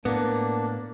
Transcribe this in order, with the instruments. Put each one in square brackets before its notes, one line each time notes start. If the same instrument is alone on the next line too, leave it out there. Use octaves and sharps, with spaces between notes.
[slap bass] A2 [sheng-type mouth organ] A#3 D4 [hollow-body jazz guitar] B3